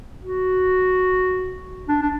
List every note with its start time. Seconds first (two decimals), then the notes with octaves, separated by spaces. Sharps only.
0.24 F#4
1.88 D4
2.02 D4